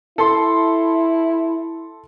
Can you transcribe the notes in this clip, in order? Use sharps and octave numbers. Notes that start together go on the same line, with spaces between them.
E4 A4 C6